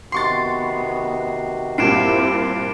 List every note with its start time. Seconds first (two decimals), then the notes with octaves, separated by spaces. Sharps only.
0.12 C3 D#3 B3 F#4 C6 C#6 A6 C7
1.78 G2 A#2 C4 E4 G4 C7 D7 E7